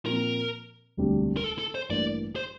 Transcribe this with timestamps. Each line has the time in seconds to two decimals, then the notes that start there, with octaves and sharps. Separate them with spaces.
0.06 A#2 F3 C4 A#4
0.97 E1 D2 C3 G3 D4
1.37 A#4
1.44 A4
1.58 A4
1.75 C5
1.89 A1 G2 E3 A#3 D4 D5
2.36 C5